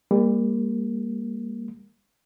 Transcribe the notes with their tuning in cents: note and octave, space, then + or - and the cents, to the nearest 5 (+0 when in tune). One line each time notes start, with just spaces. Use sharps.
G3 +40 A#3 +0